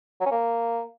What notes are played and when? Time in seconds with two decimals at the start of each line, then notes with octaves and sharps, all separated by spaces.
0.21 F#3
0.26 C#4
0.31 A#3